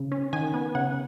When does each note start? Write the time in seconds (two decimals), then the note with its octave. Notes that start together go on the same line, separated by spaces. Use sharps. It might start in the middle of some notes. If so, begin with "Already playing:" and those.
Already playing: C#3
0.12 C#4
0.33 D#3 G#5
0.54 B3
0.75 C#3 F#5